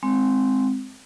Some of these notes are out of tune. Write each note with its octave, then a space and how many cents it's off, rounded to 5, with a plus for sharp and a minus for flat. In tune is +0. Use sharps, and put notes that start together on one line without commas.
G#3 +0 C4 -5